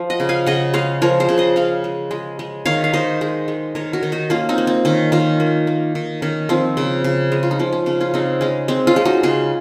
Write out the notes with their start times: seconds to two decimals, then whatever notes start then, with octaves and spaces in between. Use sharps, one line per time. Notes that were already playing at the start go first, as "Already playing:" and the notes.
Already playing: F3
0.10 D#5 F#5
0.20 C#3
0.29 F5 G#5
0.46 C#3 D#5 F#5
0.74 G#3 C#5 F5
1.02 F3 A#4 C#5
1.20 G#4 C5
1.29 C#3
1.38 C5 D#5
1.56 C#3 C#5 F5
1.84 G#3
2.11 G#3
2.39 G#3
2.65 D#3 C#5 F5
2.84 F5
2.93 D#3 C5 D#5
3.21 G#3
3.48 G#3
3.75 D#3 A#4 C#5
3.93 F#4 A#4
4.03 D#3
4.12 D#4 F#4
4.30 A#3 C#4 F4
4.49 C4 D#4
4.58 A#3
4.67 C4
4.85 D#3 C#4
5.12 D#3 C#4 F4
5.40 A#3
5.67 A#3
5.95 D#3
6.22 D#3 C#4
6.49 F3 C4
6.77 C#3
7.04 C#3
7.32 G#3
7.43 F4
7.51 D#4
7.59 F3 C#4
7.73 C#4
7.86 C#3 C#4
8.00 C#4 F4
8.14 C#3 C4 D#4
8.41 G#3 C#4
8.68 G#3 C4
8.87 C#4 F4
8.96 G#3
9.05 D#4 F#4
9.23 C#3 F4 G#4